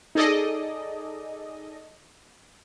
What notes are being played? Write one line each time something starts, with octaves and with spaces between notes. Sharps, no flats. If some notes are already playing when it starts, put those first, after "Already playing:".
D#4 G#4 A4 D5 D#5